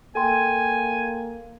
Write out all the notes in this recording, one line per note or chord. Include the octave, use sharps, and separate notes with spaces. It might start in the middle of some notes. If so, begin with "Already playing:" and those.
A#3 A4 G5 G#5 C6